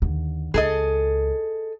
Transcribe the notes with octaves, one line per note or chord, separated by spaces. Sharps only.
D#2 D3
C#2 G#4 A4 D#5